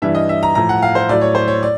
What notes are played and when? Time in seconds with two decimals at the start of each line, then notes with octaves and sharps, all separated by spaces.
0.02 G2 E3 G3 E5
0.15 D#5
0.29 E5
0.43 A#5
0.55 A2 F3 A#5
0.69 F#5
0.83 F5
0.95 C5
1.09 A2 F#3 D5
1.21 C#5
1.35 C5
1.48 C#5
1.63 D5